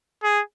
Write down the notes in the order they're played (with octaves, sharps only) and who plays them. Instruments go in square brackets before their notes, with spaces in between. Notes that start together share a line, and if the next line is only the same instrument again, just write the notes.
[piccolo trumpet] G#4